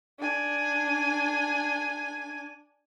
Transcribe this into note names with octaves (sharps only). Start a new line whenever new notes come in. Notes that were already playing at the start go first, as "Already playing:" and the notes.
D4 G#5